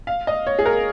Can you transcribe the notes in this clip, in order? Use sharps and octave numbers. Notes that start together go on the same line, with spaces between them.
F5
D#5
C#5
G#4
A#4